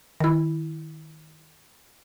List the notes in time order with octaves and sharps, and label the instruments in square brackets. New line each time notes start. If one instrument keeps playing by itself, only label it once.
[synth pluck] D#3 E4